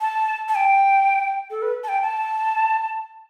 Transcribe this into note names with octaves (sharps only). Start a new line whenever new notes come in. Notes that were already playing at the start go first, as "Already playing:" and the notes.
A5
A5
G5
A4
B4
A5
G5
A5